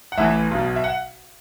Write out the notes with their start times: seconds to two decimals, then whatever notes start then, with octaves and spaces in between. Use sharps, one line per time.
0.12 F#5
0.18 A1 A2 E3 E5
0.51 B1 B2
0.76 E5
0.84 F#5